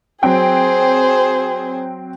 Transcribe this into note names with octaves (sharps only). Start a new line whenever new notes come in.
F#3 C4 G#4 C5 G5